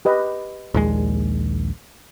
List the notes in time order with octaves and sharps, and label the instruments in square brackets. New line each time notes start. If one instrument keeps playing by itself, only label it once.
[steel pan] G4 B4 D#5
[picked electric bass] A#1 D#2 G#3